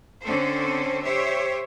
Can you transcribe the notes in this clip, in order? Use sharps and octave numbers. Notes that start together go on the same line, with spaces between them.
D3 C4 C#4 A4 C5
G4 C5 C#5 E5